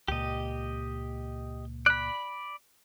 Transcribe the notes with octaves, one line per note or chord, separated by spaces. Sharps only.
C#2 A#2 G4 D#5
D5 B5 F#6